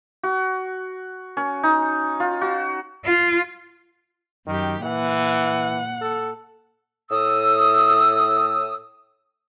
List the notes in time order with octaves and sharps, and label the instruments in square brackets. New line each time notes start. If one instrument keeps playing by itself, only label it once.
[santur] F#4
C#4
D#4
F4
F#4
[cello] F4
[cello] F#2 G4 [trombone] D#3
[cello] A#2 F#5 [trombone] E3
[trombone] A4
[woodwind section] A2 D#6 E6